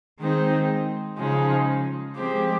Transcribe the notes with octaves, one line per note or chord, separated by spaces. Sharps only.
D#3 G#3 C4 D#4
C#3 F3 G#3 D#4
F3 G#3 C4 G4